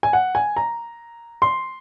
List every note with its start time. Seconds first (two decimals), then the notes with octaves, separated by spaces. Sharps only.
0.03 G#5
0.13 F#5
0.35 G#5
0.57 A#5
1.42 C6